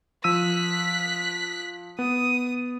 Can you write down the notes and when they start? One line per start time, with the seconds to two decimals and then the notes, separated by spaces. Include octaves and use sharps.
0.24 F3 E6 F#6 B6 D#7
1.99 B3 D#6